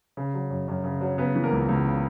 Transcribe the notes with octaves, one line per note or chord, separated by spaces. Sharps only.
C#3
F#3
F#2
F#2
C#3
F#3
C#3 B3 B4
E3
A#3 A#4
C#2
C#2
C#3